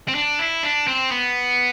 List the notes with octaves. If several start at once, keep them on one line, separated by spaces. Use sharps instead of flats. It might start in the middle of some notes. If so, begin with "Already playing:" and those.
C4
D4
E4
D4
C4
B3